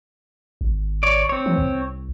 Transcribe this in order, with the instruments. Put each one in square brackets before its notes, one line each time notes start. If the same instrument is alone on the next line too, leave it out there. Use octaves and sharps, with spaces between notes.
[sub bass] G#1
[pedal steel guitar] C#5 D5
C4 C#5
[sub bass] E3
C2